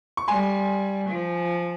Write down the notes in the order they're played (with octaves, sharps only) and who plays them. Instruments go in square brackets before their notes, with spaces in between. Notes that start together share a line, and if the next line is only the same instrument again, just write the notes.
[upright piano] C#6
[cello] G3 [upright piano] G#5 C6
[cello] F3